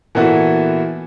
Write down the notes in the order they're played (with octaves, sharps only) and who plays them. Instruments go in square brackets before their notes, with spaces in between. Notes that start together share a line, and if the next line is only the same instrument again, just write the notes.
[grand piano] A#2 E3 B3 E4 F#4 A4